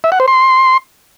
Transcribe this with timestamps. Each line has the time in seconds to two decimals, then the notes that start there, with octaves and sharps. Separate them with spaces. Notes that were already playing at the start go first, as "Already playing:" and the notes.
0.04 E5
0.12 F#5
0.20 C5
0.28 C6